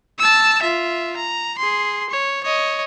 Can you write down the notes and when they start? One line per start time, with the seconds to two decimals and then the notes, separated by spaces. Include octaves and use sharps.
0.19 A5 E6
0.62 F4 E5
1.17 A#5
1.58 G#4 C6
2.10 C#5
2.44 C#5 D#5